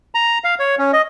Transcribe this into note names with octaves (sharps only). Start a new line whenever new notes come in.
A#5
F5
C#5
C#4
D#5